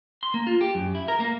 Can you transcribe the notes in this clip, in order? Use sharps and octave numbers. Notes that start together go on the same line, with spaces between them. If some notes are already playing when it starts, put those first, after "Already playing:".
C6
A#3
F4
G4
F#2
E4
A#4
A#3